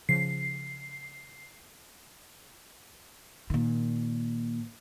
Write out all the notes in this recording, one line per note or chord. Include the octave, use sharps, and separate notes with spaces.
C#3 F3 C7
A#2 D#3